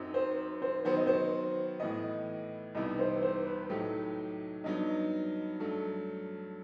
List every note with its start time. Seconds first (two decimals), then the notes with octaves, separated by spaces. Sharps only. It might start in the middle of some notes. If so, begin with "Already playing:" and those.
Already playing: F#2 F#3 C4 D#4
0.14 C5
0.62 C5
0.85 D#3 F#3 B3 F#4 C5
0.97 D#5
1.07 C5
1.80 A2 E3 B3 D#5
2.75 C2 C3 E3 B3 D#4 D#5
2.99 C5
3.22 C5
3.46 B4
3.70 A2 F#3 A3 D#4 G4
4.64 G2 F#3 B3 D#4 D#5
5.60 G2 F#3 A3